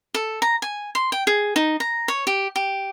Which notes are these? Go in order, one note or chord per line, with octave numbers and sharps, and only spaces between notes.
A4
A#5
G#5
C6
G5
G#4
D#4
A#5
C#5
G4
G4